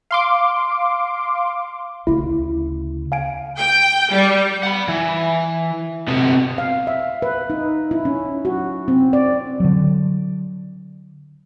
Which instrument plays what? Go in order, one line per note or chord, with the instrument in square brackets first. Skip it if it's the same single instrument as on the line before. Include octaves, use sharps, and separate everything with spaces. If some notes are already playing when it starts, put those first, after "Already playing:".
[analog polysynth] F5 C6 D6
[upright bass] D2 C#3 [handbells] E4
[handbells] F5 G#5 D7
[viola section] G5
G3
[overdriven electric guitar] F#5 B5
E3
C3 B3
[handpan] F5
E5
B4
D#4
E4
C#4
F#4
C4
D5
[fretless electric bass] D3 F#3